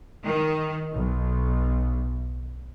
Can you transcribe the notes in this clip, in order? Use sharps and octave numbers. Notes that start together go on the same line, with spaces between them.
D#3
B1